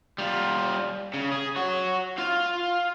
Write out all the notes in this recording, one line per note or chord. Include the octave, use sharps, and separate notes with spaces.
G3 F4
C#3
G#4
F#4 C#5
F4 F5